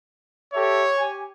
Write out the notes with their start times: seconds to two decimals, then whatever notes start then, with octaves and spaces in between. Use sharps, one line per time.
0.54 G4 A4 C#5 E5
0.98 G4 G#5